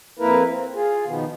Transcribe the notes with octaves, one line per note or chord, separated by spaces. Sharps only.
F2 A#3 E4 A#4 B4
C4
F4 G#4
B2 D#3 F3 B3